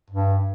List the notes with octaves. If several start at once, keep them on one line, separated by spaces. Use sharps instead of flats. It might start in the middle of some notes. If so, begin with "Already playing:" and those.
G2